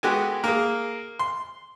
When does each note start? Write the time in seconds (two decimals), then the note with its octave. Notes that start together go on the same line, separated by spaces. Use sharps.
0.03 G#3 B3 F#4 G4 A4 G#5
0.44 A#3 G#4
1.19 C6